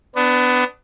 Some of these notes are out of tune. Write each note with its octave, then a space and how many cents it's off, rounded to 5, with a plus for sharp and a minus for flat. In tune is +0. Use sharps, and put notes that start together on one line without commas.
B3 +20 D4 +0